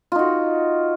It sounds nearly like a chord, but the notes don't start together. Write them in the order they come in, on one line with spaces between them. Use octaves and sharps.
F4 D#4 F#4